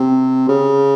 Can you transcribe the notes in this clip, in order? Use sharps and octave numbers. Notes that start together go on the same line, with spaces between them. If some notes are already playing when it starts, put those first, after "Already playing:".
Already playing: C3
C#3